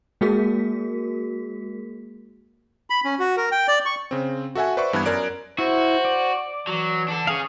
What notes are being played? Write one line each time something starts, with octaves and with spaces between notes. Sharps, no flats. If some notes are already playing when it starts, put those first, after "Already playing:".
G#3 A#3 F#4 G#4 A#4 B6
B5
C#4
F#4
A#4
G5
D5
C#6
C#3 C4
F#4 A4 E5 F#5 G#5
B4 C5 D5 E5 C#6
G2 E3 B3 B5 F#6 G#6
F#2 A#4 D5 D7
E4 F#4 C5
D5
E3 F#3
D4 A4
C#4 G#4 F5 G#5